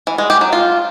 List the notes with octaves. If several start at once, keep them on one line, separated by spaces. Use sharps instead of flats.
E3
G#3
G4
F#3
F4